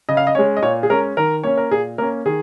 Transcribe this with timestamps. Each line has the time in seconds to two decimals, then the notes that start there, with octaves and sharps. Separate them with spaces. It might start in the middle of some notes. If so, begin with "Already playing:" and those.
0.09 C#3 D#5
0.17 F5
0.27 D#5
0.35 G#3 C#4 C#5
0.57 D#5
0.62 A#2 C#5
0.83 G#4
0.90 G#3 C#4 A#4
1.17 D#3 A#4
1.43 A#3 C#4 C#5
1.58 A#4
1.71 A#2 G#4
1.98 A#3 C#4 A#4
2.25 D#3 G#4